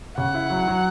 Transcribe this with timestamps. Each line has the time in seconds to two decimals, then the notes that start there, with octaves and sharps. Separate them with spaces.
0.17 C#3 F#5
0.34 E4
0.50 F#3
0.68 F#3